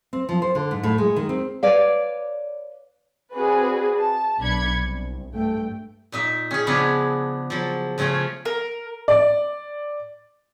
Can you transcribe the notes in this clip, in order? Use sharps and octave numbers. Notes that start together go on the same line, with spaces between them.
C4
F3
C5
D3
G#2
A2
G#3
D#3
C4
B4 C#5 D5 F5
C4 F#4 G#4 B4 D5
A5
B1 D4 B5 G#6 C#7
C2
G2 A3 G5
A#2 D#4 E5
C#4 G#4
C#3 F3 B3 D4 E4 G#4
F3 F#3
C#3 F3 A3 C#4 F4
A#4
D5